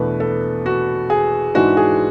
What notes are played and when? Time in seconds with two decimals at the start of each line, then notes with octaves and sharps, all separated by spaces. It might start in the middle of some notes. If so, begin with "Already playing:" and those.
Already playing: E2 B2 A3 D4 B4
0.20 A4
0.66 F#4
1.10 G#4
1.55 G#2 E3 G#3 D4 F#4
1.77 G#4